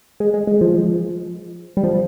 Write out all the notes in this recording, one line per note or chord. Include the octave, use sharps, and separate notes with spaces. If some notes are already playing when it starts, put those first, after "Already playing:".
G#3
G#3
G#3
F3
G3
F3